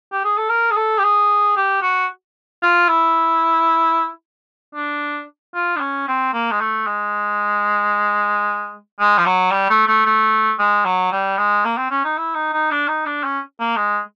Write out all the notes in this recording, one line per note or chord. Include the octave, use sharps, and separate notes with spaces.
G4
G#4
A4
A#4
G#4
A4
G4
G#4
G4
F#4
F4
E4
D4
F4
D4
C#4
C4
A#3
G#3
A3
G#3
G#3
F3
F#3
G3
A3
A3
A3
G#3
F#3
G3
G#3
A#3
C4
C#4
D#4
E4
D#4
D#4
D4
D#4
D4
C#4
A#3
G#3